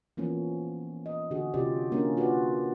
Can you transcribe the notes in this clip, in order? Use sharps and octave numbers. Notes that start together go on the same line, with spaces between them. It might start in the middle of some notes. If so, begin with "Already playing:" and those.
E3 F3 A#3 B3 C#4
D#5
D3 F#4 G#4
C3 C#4 F4 G4 D5
A#3 C#4 D4
F4 F#4 G#4 B4 D5